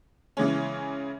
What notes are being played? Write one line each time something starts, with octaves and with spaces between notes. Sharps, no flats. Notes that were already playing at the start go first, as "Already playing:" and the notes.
C#3 E3 G#3 C#4